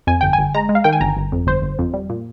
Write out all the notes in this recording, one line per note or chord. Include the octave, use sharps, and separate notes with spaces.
F2 G#5
G1 G5
G#5
G1
G#3 A#5
G#3
F5
D#3 G5
G#5
G1 A#5
G1
F2
G1 C5
G1
F2
G3
A#2